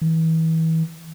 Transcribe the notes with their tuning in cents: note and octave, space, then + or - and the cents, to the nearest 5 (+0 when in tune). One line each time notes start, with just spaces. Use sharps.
E3 -35